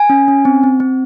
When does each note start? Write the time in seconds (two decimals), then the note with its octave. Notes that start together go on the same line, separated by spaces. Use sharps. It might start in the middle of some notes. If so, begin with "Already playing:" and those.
Already playing: G#5
0.10 C#4
0.28 C#4
0.45 C4
0.63 C4
0.80 C4